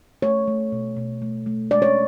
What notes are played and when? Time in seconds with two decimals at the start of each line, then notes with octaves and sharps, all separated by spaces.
0.22 A3 C#5
0.47 A3
0.72 B2
0.97 B2
1.22 A3
1.46 A3
1.71 G#3 D5
1.82 C#5